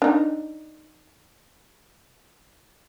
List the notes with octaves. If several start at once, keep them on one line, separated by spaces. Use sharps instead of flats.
D4 D#4